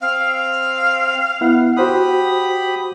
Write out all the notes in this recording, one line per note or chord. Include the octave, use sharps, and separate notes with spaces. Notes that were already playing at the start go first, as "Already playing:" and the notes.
C4 F5
B3 E4 F#5
F#4 G4 C5 F#5 B5 D#6